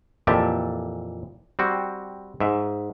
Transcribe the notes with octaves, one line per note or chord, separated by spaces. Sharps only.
F2 A#2 E3 G4 E5 A5
G3 C4 F#4
G#2 E5